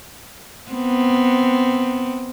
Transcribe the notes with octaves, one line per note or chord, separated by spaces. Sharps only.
B3 C4